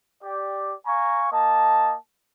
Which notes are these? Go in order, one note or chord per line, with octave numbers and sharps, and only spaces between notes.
G4 D5
F5 G#5 A#5 C#6
A#3 D#5 A5